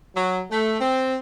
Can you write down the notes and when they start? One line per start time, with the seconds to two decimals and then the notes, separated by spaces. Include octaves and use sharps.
0.15 F#3
0.50 A3
0.79 C4